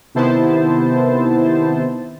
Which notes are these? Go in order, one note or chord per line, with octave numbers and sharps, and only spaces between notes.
C3 D#3 B3 E4 C5 A5